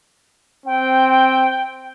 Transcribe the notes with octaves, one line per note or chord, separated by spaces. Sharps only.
C4 G5